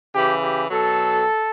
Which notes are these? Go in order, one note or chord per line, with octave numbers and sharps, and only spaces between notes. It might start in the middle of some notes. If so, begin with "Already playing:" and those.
C#3 E3 G4
G4
B2 F#3 A4